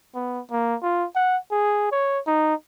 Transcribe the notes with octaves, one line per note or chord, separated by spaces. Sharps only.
B3
A#3
F4
F#5
G#4
C#5
D#4